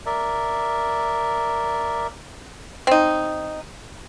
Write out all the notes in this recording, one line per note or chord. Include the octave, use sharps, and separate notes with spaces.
A#4 D5 E5
C4 D#4